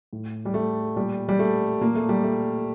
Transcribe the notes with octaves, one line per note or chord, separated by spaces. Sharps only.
A2
G3
A3
A#2 G3
G3
A3
A#2 A#3
A3
G3
A3